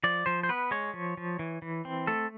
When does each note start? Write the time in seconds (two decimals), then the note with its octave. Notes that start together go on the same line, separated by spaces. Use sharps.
0.04 F3 D5
0.26 F3 C5
0.43 C5
0.49 B3 B4
0.71 G#3 C#5
0.94 F3
1.17 F3
1.39 E3
1.62 E3
1.85 C4
2.07 A3 A4